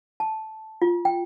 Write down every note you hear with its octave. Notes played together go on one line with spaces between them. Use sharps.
A5
F4
G5